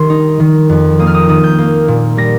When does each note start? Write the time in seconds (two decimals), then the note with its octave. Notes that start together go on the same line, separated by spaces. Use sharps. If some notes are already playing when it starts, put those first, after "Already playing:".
Already playing: D#3 G3 C6
0.10 D#4
0.40 D#3
0.69 F2
0.99 A#3 D#6
1.07 F6
1.14 D#6
1.29 D#3 D#6
1.44 G6
1.58 A#3
1.88 A#2
2.17 G3 A#6